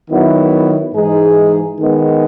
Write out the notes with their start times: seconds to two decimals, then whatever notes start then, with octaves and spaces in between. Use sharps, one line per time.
0.10 D#3 F#3 B3 E4
0.94 G#2 E3 G#3 D#4 G#4
1.79 D#3 G#3 B3